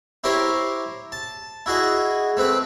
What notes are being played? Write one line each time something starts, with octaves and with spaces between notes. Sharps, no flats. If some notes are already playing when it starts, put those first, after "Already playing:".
E4 G4 A#4 C5 C#5
A5
E4 F#4 G#4 D#5
A3 C4 B4